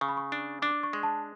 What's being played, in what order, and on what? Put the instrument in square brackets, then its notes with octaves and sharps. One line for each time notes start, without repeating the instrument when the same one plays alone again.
[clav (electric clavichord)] C#3 [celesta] C#6
[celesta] B5
C#6
[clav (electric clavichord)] D4
[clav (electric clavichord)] D4 [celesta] D6
[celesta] C#6
[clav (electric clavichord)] G#3
[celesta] A5